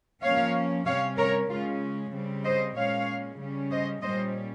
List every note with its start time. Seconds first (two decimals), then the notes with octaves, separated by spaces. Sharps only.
0.22 F3 A#3 C#4 C#5 F5
0.85 C3 G3 C#4 C#5 F5
1.17 A#4 C#5
1.48 C#3 G#3 C#4 F4
2.12 C#3 G3 C4
2.44 C5 D#5
2.75 A#2 G#3 C#4 C#5 F5
3.38 C#3 G3 C#4
3.70 C5 D#5
4.01 A#2 G3 C#4 C5 D#5